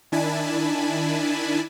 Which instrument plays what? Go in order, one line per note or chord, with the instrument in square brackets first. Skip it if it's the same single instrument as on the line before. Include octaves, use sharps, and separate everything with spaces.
[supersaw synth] D#3 D4 E4 G#5 A5 B5